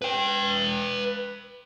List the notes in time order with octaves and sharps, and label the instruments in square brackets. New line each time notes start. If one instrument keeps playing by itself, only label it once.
[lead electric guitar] B4 G5